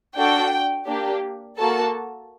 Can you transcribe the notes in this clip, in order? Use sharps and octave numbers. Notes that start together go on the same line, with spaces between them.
D4 F#4 A4 G5
A#3 D4 G4
A#3 F#4 A4 A5